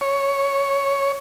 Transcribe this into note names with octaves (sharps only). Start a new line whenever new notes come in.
C#5